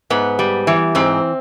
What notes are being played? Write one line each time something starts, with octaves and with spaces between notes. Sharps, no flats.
G#2 B3
G3
E3
G#2 C4